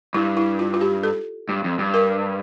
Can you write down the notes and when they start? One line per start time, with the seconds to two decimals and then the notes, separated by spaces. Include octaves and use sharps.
0.14 G2 E4
0.37 E4
0.59 F4
0.74 F4
0.81 G4
1.03 A4
1.49 G2
1.64 F2
1.79 G2
1.94 A#4